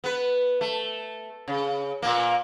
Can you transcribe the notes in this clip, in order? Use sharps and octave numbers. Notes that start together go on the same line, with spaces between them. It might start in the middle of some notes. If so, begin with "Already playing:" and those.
B3 B4
A3
C#3
A#2 A#3